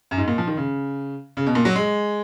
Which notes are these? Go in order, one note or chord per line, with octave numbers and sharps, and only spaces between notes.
F#2
G#2
A#2
F3
D#3
C#3
C#3
B2
A#2
F#3
G#3